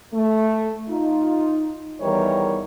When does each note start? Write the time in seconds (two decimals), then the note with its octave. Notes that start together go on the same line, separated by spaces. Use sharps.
0.13 A3
0.88 D#4 F4
2.01 E2 D#3 E3 G3 A#4 C#5